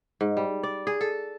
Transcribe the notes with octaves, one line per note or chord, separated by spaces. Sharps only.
G#2
G3
D5
G#4
A4